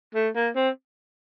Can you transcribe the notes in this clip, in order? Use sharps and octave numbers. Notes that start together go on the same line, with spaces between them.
A3
A#3
C4